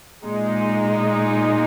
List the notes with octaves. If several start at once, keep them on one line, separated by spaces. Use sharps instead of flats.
A#2 G#3 D#4